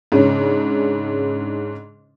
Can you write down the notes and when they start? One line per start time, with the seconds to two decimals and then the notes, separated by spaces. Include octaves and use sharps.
0.12 G#2 C#3 C#4 D4